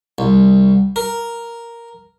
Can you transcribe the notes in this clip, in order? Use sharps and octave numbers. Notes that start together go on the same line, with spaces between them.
C2
A#4